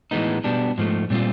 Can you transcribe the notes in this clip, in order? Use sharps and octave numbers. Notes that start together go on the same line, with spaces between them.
A2 E3 G#3 B3 D#4
B2 G3 B3 D4
G#2 F3 A3
A#2 G3 C4 F4